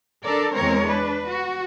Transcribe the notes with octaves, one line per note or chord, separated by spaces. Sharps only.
D4 A4 A#4 D5
E2 G#3 C4 A#4 C#5
D4 B4
F#4